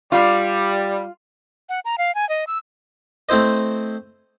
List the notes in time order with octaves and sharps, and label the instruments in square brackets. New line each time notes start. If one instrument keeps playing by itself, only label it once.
[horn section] G3 [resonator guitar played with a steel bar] F4
[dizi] F#5
A#5
F5
G#5
D#5
E6
[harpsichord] A3 C4 E4 C5 D#5